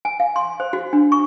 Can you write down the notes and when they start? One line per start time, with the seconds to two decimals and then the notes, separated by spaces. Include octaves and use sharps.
0.05 G#5
0.20 F5
0.36 C6
0.60 C5
0.73 F#4
0.93 D4
1.12 C#6